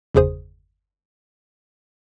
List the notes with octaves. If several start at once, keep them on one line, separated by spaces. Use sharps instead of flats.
G1 E2 C#3 G#4 C5 D#6